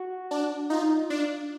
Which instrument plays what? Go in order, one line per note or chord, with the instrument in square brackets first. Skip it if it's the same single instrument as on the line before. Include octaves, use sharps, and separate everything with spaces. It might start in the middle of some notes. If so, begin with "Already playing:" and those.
Already playing: [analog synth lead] F#4
[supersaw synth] D4
[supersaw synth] D#4 [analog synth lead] F4
[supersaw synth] D4